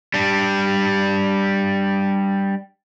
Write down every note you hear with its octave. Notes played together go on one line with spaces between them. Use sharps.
G3 D4